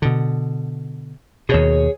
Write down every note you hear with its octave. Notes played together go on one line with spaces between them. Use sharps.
B2 D3
D#2 B2 G#4 C#5